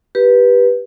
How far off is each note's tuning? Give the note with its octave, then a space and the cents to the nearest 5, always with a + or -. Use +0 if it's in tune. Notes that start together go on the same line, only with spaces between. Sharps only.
G4 -5 B4 -15